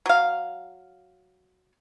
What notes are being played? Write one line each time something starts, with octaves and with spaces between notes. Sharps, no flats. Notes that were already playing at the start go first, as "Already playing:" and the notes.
F#3 F5